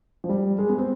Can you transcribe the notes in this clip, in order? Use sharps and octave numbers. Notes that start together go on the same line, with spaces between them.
F3
G3
G#3
B3
C4